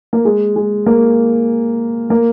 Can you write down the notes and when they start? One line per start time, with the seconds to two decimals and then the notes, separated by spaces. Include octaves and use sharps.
0.13 A#3
0.25 G#3
0.56 G#3
0.86 A#3
2.10 A#3